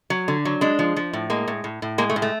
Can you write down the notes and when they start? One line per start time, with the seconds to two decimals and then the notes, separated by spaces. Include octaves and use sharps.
0.10 F#3
0.28 D3
0.45 F#3
0.61 G#3 D4
0.79 F3
0.96 F3
1.13 A2
1.30 G#3 A#3
1.48 A2
1.64 A2
1.82 A2
1.98 G#3 A#3
2.10 A3
2.16 A2
2.22 A3